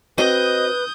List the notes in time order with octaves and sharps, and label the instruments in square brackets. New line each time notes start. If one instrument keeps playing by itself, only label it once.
[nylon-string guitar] C4 F#4 G5 [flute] B4 [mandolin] D#5 [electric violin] D#6 G6